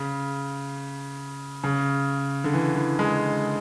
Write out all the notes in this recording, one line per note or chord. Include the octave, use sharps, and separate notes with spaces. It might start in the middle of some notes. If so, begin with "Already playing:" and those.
Already playing: C#3
C#3
D3
E3
E3
G#3